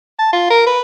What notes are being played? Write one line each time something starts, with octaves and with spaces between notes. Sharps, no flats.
A5
F4
A#4
B4